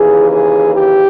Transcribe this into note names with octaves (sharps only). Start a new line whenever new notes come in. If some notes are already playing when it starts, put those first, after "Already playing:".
Already playing: D#2 C#3 E3 G#4
G#4
G4